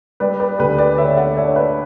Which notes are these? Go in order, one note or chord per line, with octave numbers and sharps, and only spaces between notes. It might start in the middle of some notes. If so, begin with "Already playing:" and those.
G3 B4 D5
B4 D5
D2 G4 B4
B4 D5
D3 C#5 E5
D5 F#5
D4 C#5 E5
B4 D5